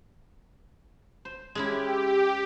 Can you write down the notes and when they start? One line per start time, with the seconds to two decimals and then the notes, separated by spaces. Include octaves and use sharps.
1.25 C5
1.55 G#3 C#4 E4 G4